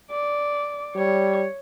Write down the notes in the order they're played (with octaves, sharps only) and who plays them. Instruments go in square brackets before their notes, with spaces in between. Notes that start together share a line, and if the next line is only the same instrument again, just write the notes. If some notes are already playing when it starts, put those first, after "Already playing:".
[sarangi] D5
[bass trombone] G3 [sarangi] C#5